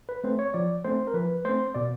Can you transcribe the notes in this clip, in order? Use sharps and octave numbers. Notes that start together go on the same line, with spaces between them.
B4
A3 C4 C5
C#5
F3 D5
A3 C4 C5
A#4
F3 B4
A3 C4 C5
B2 D5